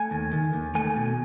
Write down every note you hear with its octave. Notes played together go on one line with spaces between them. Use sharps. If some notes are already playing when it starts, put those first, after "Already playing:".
Already playing: A3 G#5
D#2
D#3
D#2
A3 G#5
B2